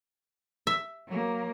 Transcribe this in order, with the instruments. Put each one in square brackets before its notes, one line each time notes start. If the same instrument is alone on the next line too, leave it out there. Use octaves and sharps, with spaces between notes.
[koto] E5
[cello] F#3 A#3